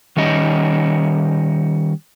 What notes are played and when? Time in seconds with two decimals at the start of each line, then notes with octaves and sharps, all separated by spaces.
0.17 D#3 G3 C#4 D#5